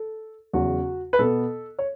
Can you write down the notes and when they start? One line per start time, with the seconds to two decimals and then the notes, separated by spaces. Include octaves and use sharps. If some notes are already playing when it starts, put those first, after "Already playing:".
Already playing: A4
0.53 E2 C#3 F#3 F#4
1.13 B4
1.19 B2 B3 A4
1.79 C#5